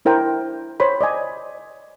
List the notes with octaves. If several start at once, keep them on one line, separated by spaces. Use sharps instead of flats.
D4 E4 A#4 C5 G5
C5 C#5 B5
D5 D#5 G#5